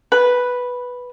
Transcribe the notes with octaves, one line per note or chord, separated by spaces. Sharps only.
B4